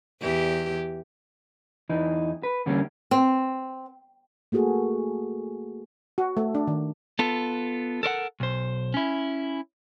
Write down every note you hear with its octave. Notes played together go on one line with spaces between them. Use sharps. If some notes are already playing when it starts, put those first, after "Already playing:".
E2 E3 G4
E2 E3 D#4
B4
E2 D3 G3 A#3 C#4
C4
A3 A#3 F#4 G#4 A4
F#4
A3
D4
D#3
B3 F4 A4
A4 A#4 C#5 F#5
B1 C5
C#4 E4